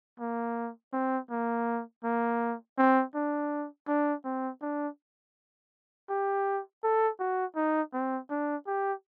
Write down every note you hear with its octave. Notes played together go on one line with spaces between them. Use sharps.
A#3
C4
A#3
A#3
C4
D4
D4
C4
D4
G4
A4
F#4
D#4
C4
D4
G4